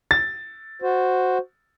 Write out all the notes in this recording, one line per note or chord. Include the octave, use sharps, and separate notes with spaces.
A6
F#4 C5